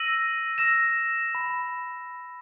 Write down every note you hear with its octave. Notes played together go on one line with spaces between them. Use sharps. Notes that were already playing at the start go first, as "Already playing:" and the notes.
Already playing: E6 A#6 D#7 F#7
E6 A#6 E7
B5